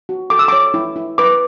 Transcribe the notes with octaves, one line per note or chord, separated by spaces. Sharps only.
F#4
A4 D6
E6
D6
C#5
E4
E4
B4 D6